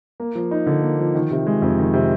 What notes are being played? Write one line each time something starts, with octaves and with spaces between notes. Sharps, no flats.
A#3
F3
D#4
D3
A#3
F3
D#3
C3
G#3
F2
D#3
C3